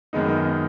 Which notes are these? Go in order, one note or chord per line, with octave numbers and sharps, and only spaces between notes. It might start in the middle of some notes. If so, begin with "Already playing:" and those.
F#2 D#3 G#3 B3 D#4